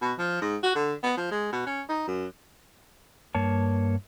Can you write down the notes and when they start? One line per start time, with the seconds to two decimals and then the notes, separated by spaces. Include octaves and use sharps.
0.01 B2
0.18 F3
0.41 G#2
0.63 F#4
0.75 D3
1.03 B3
1.17 F3
1.31 G#3
1.53 B2
1.66 C#4
1.89 D#4
2.08 F#2
3.35 G2 A#3 C#5 A5